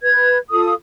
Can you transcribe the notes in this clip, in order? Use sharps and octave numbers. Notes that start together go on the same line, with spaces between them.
B4 G#6
F4 A4 D#6